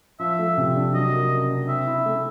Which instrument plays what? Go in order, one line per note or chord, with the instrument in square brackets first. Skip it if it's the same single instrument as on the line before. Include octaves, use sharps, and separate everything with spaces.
[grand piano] F3 [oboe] E5
[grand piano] A3
C3
D4
[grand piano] F#3 [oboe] D#5
[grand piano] A#3
C#3
D4
[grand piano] C4 [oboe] E5
[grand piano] E4
A3